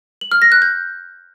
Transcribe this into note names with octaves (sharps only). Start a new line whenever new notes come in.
F#7
F6
A#6
F#6
G6